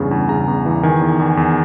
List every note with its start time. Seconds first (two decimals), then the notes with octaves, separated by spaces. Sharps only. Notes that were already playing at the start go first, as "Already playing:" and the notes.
Already playing: E2 G2 C#3 C#6
0.11 E2
0.29 C#3 A#5
0.48 E2
0.66 E3
0.83 D#3 G#5
1.01 E2
1.20 E2
1.37 E2